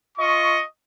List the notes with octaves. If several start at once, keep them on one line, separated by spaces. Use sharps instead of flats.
F4 D#5 C#6